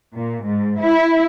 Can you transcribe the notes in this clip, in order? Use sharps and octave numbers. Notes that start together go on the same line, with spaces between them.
A#2
G#2
E4